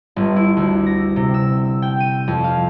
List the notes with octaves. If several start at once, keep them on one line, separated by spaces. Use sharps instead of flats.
G1
E4
D2
A#6
C3
E6
G5
D#7
F2
F5